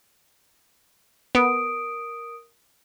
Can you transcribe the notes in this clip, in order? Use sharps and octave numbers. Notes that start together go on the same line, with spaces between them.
B3 A#4 D#6 D7